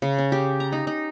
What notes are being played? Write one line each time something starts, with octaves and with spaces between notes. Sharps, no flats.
C#3
C#4
G4
A#5
D#4
D#4